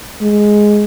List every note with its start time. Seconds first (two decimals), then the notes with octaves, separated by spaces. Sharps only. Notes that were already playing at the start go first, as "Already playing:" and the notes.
0.22 G#3